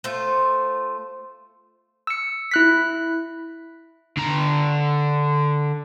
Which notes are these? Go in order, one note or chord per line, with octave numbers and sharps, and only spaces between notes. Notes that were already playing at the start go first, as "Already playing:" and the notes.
A3 F4 C5
E6 C#7
E4 F#6 B6
D3 A#5